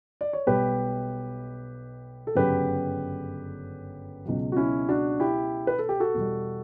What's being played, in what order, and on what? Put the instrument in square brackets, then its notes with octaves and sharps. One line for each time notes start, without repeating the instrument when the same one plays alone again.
[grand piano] D5
C#5
B1 B2 G3 G4 B4
A4
G1 F#2 C#3 F#3 G4 B4
C#2 B2 F#3
F#4
C#4 E4
D4 F#4
E4 G4
B4
A4
G4
F#4 A4
E2 B2 G3